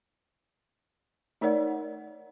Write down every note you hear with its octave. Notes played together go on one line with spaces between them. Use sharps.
A3 D#4 A#4 C#5 D5 F#5